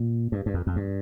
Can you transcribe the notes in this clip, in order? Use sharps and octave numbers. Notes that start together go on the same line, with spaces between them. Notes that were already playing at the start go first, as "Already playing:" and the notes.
Already playing: A#2
G2
G2
F2
F2
G2